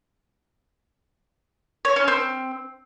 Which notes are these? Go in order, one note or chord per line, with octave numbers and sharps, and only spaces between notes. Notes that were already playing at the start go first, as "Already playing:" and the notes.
C#5
C#4
C4